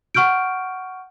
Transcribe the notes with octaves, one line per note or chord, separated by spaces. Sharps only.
F#5 C#6 F6 G6 D7